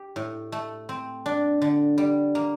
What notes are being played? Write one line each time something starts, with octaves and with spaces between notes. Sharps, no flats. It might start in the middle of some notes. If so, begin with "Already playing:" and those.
Already playing: G4
A2
A3
C4
D4
D3
G3
A#3